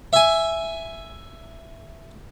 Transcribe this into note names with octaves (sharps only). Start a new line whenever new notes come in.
E5 G#5